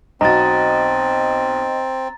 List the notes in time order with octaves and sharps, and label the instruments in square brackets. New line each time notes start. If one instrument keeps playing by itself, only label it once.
[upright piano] B1 F#4 [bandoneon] C4 [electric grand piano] D#5 [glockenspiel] A#5 A6